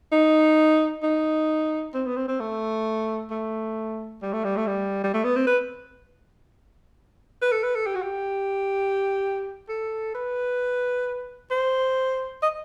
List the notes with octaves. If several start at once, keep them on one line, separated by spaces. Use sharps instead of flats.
D#4
D#4
C4
B3
C4
C4
A3
A3
G3
A3
G3
A3
G3
G3
A3
B3
C4
B4
B4
A4
B4
A4
G4
F#4
G4
A4
B4
C5
D#5